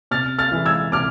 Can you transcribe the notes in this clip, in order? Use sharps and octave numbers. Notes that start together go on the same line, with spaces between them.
C3 F6 A6
F6 A6
E3 G#3
E6 G#6
C3 D6 F6